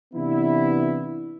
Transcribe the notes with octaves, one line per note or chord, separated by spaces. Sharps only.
C3 E3 B3 D4 E4